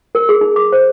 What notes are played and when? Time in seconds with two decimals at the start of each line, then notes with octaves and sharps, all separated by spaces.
0.15 A#4
0.29 G#4
0.41 D#4
0.56 D6
0.72 C5